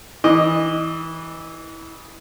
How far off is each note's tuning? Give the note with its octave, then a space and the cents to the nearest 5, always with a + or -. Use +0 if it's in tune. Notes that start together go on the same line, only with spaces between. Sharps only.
E3 -20 D#5 +0 D6 +0